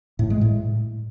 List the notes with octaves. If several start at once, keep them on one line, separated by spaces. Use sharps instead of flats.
A2
G#3
A2